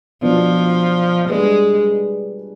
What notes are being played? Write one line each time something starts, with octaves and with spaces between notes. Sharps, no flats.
B2 F3 B3 D4 F4
G3 G#3 D4 G#4 B4